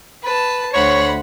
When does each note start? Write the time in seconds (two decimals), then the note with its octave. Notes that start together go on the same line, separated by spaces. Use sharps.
0.24 B4 A5
0.74 D2 C5 C#5 F#5 B5